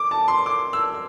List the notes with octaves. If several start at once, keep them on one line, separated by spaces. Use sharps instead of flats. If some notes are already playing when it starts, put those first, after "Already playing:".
Already playing: D6
A5
C6
D6
E6